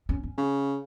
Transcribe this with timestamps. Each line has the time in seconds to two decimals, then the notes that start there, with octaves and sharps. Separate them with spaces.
0.09 C#4
0.23 C#4
0.38 C#3